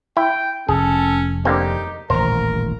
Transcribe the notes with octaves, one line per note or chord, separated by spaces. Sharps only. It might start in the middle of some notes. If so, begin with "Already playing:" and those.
E4 G5
F1 C#4 G#4 A4
D3 A#3 C4 D#4 G4
D#1 A1 A#4 C5 A#5